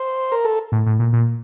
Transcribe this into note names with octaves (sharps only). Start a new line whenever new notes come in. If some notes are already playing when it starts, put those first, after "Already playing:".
Already playing: C5
A#4
A4
A2
A2
A#2
A#2